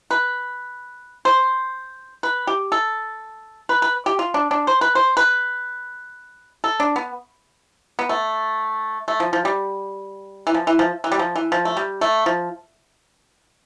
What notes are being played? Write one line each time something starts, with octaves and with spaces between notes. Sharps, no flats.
B4
C5
B4
G4
A4
B4
B4
G4
F4
D4
D4
C5
B4
C5
B4
A4
D4
B3
B3
A3
A3
F3
F3
G3
E3
F3
E3
F3
E3
G3
F3
E3
F3
A3
G3
A3
F3